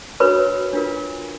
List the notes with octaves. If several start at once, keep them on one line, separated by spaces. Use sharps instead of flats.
D4 F#4 A#4 B4 C#5 B5
D4 F4 A#4